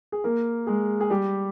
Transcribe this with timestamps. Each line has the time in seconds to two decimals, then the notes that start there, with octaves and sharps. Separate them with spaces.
0.12 G#4
0.24 A#3 A#4
0.67 G#3 G#4
1.01 G#4
1.10 G3 G4